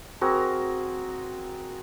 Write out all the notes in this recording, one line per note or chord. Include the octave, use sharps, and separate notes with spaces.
C4 F#4 G#4 A#4